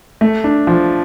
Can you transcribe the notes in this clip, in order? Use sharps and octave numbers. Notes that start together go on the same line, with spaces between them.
A3
D4
F3